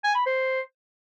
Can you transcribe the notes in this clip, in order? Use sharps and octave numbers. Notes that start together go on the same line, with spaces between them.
G#5
B5
C5